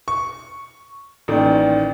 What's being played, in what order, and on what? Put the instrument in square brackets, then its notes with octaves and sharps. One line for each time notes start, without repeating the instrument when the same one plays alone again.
[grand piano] C#6
[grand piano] A1 D#3 [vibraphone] A#3 D5 G5